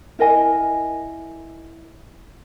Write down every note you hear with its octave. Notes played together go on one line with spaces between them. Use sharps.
E4 A#4 D#5 G#5